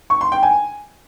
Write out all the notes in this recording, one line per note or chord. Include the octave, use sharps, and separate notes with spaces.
C#6
C6
G5
G#5